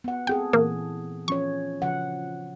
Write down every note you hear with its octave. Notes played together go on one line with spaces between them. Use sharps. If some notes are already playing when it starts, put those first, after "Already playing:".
B3 F#5
C4 G#4 A4 G5
A#2 E3 A#3
F3 C#4 C#5 C#6
C#3 F3 F#5